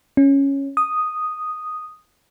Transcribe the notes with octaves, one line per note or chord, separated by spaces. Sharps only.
C#4
D#6